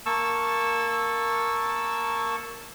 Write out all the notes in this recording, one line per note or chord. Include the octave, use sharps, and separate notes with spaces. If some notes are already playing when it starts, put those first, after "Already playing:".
A#3 A5 C#6 E6